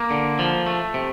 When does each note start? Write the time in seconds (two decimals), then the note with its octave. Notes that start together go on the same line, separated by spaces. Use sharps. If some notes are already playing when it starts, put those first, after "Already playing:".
Already playing: A#3
0.11 D3
0.39 F3
0.66 A3
0.94 C3